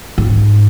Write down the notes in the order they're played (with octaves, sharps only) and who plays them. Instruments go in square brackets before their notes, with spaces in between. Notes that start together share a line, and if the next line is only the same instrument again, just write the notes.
[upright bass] G#2